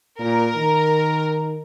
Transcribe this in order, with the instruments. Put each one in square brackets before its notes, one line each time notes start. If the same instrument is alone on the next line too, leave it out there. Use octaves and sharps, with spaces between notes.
[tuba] A#2 [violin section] A#4
[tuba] D#3